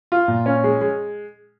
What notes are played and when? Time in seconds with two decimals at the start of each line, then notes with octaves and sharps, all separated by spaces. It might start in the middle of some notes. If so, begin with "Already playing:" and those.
0.12 F4
0.28 A#2
0.46 C#4
0.64 G#3
0.81 G#3